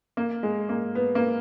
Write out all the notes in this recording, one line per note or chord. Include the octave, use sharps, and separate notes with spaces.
A#3
G#3
A#3
B3
A#3